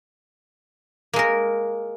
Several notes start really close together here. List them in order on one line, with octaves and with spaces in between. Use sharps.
A#3 G#3 A#4